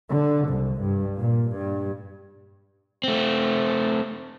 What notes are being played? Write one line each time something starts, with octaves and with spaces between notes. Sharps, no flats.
D3
C2
G2
A#2
G2
A3 C4